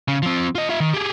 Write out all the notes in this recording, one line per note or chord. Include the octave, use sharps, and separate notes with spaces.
C#3
F3 C4
F4 D#5
F4 E5
D#3
G4 G#4